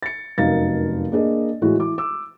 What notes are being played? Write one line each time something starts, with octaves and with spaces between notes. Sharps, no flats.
A6 C#7
F1 F#2 D#4 A#4 F5 A6
A#3 D4 G#4 D#5
A2 E3 G#3 F#4
E3 D6
D6 E6